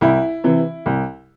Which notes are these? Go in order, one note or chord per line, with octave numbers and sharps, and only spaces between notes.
C2 E4
C3 E3
C2